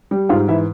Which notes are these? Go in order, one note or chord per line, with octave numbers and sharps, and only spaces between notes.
G3
G#2 F4 F5
E3 E4 E5